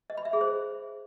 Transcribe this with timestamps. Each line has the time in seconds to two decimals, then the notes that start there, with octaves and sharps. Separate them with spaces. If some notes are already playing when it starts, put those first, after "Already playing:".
0.10 D#5
0.17 B5
0.25 E5
0.33 G#4
0.41 C5